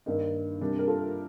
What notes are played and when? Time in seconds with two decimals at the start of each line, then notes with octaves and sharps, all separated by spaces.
0.06 G2 D#3 A#3 D#4
0.60 C3 G3 A#3 D4
0.79 A#4
0.88 F4 A4